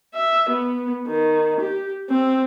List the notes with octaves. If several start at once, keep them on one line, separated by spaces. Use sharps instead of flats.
E5
B3
D#3
G4
C4